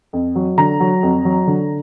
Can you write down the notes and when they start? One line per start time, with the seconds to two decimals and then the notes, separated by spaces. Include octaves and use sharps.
0.13 F2
0.35 F#3
0.58 D3 A#5
0.80 F#3
1.03 F2
1.25 F#3
1.47 D3